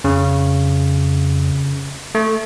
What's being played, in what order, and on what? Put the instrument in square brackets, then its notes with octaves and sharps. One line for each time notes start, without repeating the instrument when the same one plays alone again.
[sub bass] F2 [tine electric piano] C#3
[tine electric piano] A3